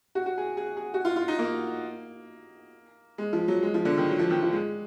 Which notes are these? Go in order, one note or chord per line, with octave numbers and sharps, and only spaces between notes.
F#4
F#4
G#4
G#4
G#4
F#4
F4
F4
D#4
A#3
G#3
F3
F#3
G#3
F3
D3
D#3
F#3
F3
D#3
F3
G#3